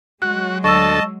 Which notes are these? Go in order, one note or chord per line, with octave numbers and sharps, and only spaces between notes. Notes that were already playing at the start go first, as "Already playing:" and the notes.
F#3 G#3 F#4 F#6
D2 A4 D#5 A5 C#6 E6